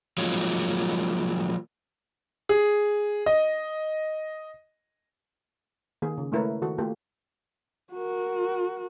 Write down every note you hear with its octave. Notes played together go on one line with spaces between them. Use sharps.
F3 F#3 G#3 A#3 F4 C#5
G#4
D#5
D#3 A#3 G#4
C#3
G#3 A3 E4 A#4 B4 C#5
D#3 F#4 A4
A3 A#3 F4 G4 A4
F#4 A#4